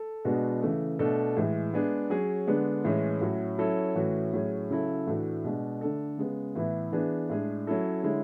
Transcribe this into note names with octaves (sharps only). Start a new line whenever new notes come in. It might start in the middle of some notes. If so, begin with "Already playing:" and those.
Already playing: A4
B2 G#3 B3 D4 F#4
C#3 E3 A3
B2 A3 D4 A4
A2 E3 G#3
G#3 B3 D4 G#4
F#3 C#4 G#4
D3 G#3 B3 D4
A2 E3 G#3 C#4
A2 F#3 C#4 F#4
F#3 C#4 E4 A4
A2 E3 A3 C#4 F#4
A2 F#3 C#4 G#4
C#3 F#3 C#4 E4 A4
A2 E3 A3 D4 F#4
B2 G#3 D4
D3 A3 D4 A4
C#3 G#3 B3
A2 E3 B3 E4
E3 B3 D4 G#4
A2 G#3 D4 G#4
F#3 C#4 E4 A4
D3 G#3 C#4 E4